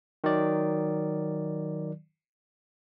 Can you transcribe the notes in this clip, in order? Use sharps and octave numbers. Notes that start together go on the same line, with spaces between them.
D#3 F#3 D5